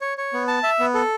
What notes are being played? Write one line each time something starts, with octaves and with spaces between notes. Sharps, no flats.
C#5
C#5
B3
A5
E5
B3
A4